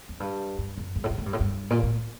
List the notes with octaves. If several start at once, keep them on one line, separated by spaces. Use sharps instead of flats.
F#2
G2
G2
F#2
G2
A2
G2
A2
G2
A2
G2
A#2
A2